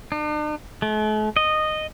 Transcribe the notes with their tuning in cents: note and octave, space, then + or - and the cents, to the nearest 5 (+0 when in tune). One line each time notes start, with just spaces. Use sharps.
D4 +45
A3 -45
D#5 -10